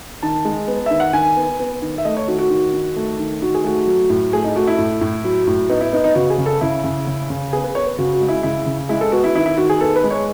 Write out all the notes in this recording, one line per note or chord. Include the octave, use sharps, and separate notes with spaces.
D#3 A5
G#3
B3
D#3 E5
F#5
D#3 G#5
B3
B3
D#3
E5
A3 D#5
C#5
D#3 F#4
F#4
D#3
D#3
A3
D#3
D#3 F#4
G#4
A3 F#4
F#3
A2
A3 G#4
D#4
A3 F#4
E4
A2
A2
F#3
A2
B3 D#4
E4
B3 D#4
D#4
C#3 F#4
G#4
C#3
A4
C#3 E4
C#3
C#3
C#3
B3 G#4
B4
B3 C#5
B4
C#3 F#4
F#4
G#3
E4
C#3 E4
C#3
G#3 E4
A4
B3 F#4
E4
D#3 E4
E4
D#3 F#4
G#4
B3 A4
B4
G#3
C#5